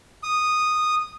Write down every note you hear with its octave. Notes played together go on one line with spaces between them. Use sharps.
D#6